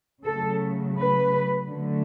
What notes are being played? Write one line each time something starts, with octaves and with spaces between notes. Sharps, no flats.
C#3 F#3 A3 A4
B4
D3 F#3 A3